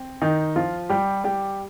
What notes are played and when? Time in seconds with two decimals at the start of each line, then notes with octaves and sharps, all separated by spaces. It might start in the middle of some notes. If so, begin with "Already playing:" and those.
Already playing: C4
0.22 D#3 D#4
0.56 F3 F4
0.89 G3 G4
1.24 G3 G4